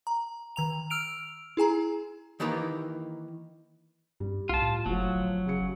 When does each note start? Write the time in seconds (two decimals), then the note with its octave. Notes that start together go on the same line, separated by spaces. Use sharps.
0.07 A#5
0.56 D#3 A#5 F7
0.90 E6 F6 D7 F7
1.57 E4 G#4 G#5 A#5
2.40 D#3 E3 A#3 D#4 G4 A#4
4.20 G2 G3
4.49 C2 F4 A5
4.62 A2
4.86 F#1 A2 F3 F#3
5.15 G1
5.46 C#3 G#4 C#7